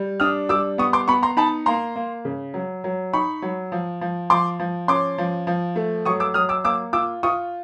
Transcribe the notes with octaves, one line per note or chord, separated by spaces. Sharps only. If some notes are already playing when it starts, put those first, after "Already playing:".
Already playing: G3
D4 D#6 F6
G3 D6 E6
B3 C#6 D#6
C6 D6
B3 B5 C#6
A#5 C6
D#4 A5 B5
A#3 A#5 C6
A#3
C#3
F#3
F#3
D#4 B5 C#6
F#3
F3
F3
F3 C6 D6
F3
C#4 C6 D6
F3
F3
A3
F#3 C#6 D#6
D6 E6
F#3 D#6 F6
D6 E6
A#3 D6 E6
F4 D6 E6
F4 C#6 D#6